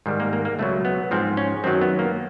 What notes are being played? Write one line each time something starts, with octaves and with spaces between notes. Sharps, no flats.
G#2 D#3 G3
A#3
A#3
A#3
C#2 B2 F#3 A3
B3
G#2 F3 C4
C#4
F#2 D#3 F#3 C4
B3
A#3